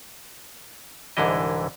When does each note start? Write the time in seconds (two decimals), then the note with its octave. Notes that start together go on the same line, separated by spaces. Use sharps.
1.17 C2 G#2 D3 E3 E4 D#5